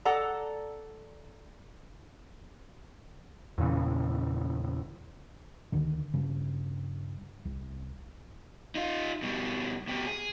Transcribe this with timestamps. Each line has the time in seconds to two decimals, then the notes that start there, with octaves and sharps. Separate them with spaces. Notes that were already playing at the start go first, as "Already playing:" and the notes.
0.05 A4 D5 F#5 A#5
3.58 E2 A#2 C#3 E3
5.72 D2 D3 D#3
6.14 G2 C#3
7.45 C2
8.75 D#4 F4
9.22 B2 G3
9.88 B2 G4
10.06 G#4